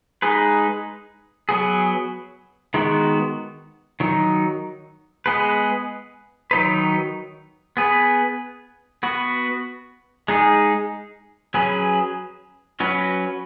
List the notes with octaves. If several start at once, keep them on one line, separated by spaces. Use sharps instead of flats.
G#3 D#4 G#4 B4
F#3 B3 G#4
D#3 G#3 B3 F#4
D#3 F#3 D#4
G#3 B3 G#4 B4
D#3 F#3 D#4 B4
B3 G#4 B4
B3 F#4 B4
G#3 D#4 G#4
F#3 C#4 G#4 B4
F#3 C#4 F#4 B4